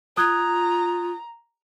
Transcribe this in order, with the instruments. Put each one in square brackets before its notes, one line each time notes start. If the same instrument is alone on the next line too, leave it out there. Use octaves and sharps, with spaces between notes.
[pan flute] F4 [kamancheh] A#5 [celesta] D#6 F#6 G#6